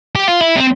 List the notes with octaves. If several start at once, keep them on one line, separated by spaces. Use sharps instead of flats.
G4
F4
E4
C4